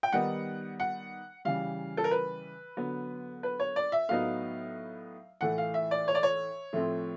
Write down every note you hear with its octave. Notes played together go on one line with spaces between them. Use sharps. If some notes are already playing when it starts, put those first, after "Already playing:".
G5
D#3 G3 B3 D#4 F#5
F#5
C#3 E3 G3 F5
A4
A#4
B4
D3 F#3 B3
B4
C#5
D5
E5
A2 F#3 B3 D#4 F5
A2 E3 A3 F#5
F5
E5
D5
C#5
D5
C#5
A2 F3 A3 C4